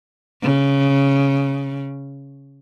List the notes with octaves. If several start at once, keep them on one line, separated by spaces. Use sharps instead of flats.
C#3